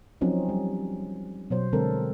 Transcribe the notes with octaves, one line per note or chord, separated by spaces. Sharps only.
F3 F#3 C4 C#4 D#4
G3
B2 F#3 C5
D3 G#3 C4 A4 A#4